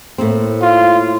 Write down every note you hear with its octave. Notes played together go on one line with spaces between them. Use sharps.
A2 A#3 C4
F4